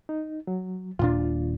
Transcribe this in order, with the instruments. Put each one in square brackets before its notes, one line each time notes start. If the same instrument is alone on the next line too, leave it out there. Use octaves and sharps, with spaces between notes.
[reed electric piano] D#4
F#3
[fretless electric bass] D#1 A#2 D4 [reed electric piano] F4